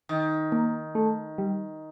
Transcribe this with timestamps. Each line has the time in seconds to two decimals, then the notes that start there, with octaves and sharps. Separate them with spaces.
0.09 D#3
0.52 A#3
0.95 A3
1.38 G3